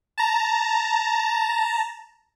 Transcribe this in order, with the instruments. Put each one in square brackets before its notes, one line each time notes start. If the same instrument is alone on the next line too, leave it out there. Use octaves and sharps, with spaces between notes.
[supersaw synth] A5 A#5